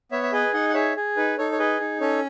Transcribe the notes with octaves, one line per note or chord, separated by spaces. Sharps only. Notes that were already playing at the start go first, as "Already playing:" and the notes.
B3 C#5 E5
E5
G#4 B4 D#5
D#4 D#5 F#5
F#5
G#4 C#5 E5
G#4
D#4 B4
D#4 A4 C#5
C#5
G#4 B4 D#5
D#4
C#4 A4 C#5